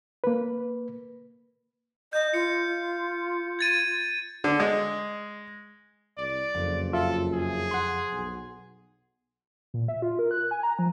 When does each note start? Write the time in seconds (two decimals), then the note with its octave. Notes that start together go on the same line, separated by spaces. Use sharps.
0.24 A#3 B4
2.13 D#5 G6
2.34 F4 C#7
3.59 G#6 A6 D#7
4.44 D3
4.60 G#3
6.18 C2 D5
6.55 F#1 F2
6.93 F4 A4 E5
7.33 G#4
7.71 F#5 C6
8.12 B1
9.74 A#2
9.88 E5
10.02 F4
10.19 A#4
10.31 F#6
10.51 G#5
10.63 A#5
10.79 F3